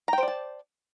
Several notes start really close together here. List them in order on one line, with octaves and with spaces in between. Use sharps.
A#5 G5 C5 D5 A5